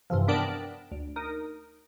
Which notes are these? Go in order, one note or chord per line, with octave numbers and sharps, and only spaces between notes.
G2 C3 E3 F3
B3 D4 A#4 D5 G5 A5
D2
D#4 A#4